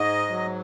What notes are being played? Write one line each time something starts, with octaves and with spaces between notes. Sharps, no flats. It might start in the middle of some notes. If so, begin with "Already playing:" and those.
Already playing: G#2 D#5
F#3